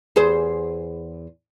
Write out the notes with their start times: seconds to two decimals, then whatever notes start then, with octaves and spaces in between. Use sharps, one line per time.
0.16 E2 G#4 C5